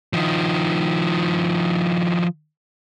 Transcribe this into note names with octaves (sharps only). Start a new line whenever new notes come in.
D#3 F3